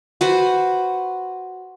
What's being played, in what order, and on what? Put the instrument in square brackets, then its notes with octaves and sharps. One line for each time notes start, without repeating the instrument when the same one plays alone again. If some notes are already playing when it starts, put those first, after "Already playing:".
[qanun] F#4 B4 C5